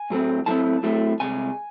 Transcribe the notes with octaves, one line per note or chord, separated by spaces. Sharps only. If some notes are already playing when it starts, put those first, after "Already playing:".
Already playing: G#5
A2 F#3 A3 C4
A2 F#3 A3 C4 A5
A2 F#3 A3 C4
C2 C3 G#3 G#5